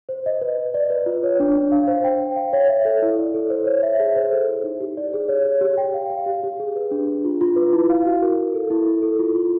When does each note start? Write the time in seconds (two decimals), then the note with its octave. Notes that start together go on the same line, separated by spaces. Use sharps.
0.09 C5
0.26 D#5
0.41 B4
0.57 B4
0.74 D5
0.90 B4
1.06 F4
1.24 C#5
1.40 D4
1.56 D4
1.72 F5
1.87 C5
2.04 G5
2.20 G5
2.36 F5
2.53 C#5
2.69 E5
2.85 A4
3.02 E4
3.18 D5
3.34 A4
3.50 C5
3.66 C#5
3.83 E5
4.00 G#4
4.16 C5
4.32 A4
4.48 E4
4.64 D#4
4.80 G4
4.97 D5
5.13 G#4
5.29 C#5
5.45 C#5
5.61 G4
5.77 G5
5.94 F5
6.10 F5
6.26 G4
6.43 G4
6.60 G#4
6.76 B4
6.91 D4
7.07 D4
7.25 F4
7.41 F4
7.56 B4
7.73 E4
7.90 F5
8.06 F#4
8.22 A#4
8.38 A#4
8.54 A4
8.70 E4
8.86 A4
9.02 A4
9.19 F4
9.35 F4